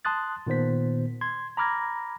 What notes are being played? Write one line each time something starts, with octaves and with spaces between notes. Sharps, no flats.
A5 C6 D#6 F#6 A6
A#2 D#3 B3 C5 B6
C6 G#6
A#5 B5 D6 F6 G#6 A#6